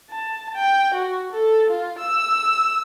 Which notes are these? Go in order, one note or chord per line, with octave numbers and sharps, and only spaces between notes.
A5
G5
F#4
A4
F4
E6